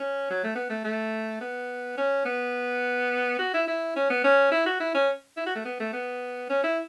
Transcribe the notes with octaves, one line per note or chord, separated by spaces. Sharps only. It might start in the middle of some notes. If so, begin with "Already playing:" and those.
Already playing: C#4
F#3
A3
B3
A3
A3
B3
C#4
B3
F#4
E4
E4
C#4
B3
C#4
E4
F#4
E4
C#4
E4
F#4
A3
B3
A3
B3
C#4
E4